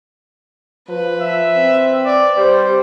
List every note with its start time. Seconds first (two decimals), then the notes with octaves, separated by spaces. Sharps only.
0.89 F3 B4
1.21 E5
1.56 C4
2.05 D5
2.37 G3 G4 C5